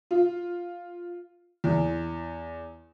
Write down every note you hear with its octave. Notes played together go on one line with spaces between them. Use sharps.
F4
E2